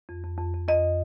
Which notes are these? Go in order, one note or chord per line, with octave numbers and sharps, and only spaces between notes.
F2
F2
F2
F2
F2 D#5